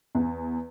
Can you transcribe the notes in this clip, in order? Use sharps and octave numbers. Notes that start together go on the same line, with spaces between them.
E2